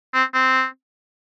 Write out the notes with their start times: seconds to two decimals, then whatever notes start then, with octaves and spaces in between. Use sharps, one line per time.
0.14 C4
0.34 C4